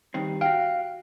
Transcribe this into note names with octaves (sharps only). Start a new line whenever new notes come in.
G2 D#3 C4
F#4 F5 G5